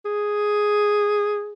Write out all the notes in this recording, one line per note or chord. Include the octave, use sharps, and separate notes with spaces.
G#4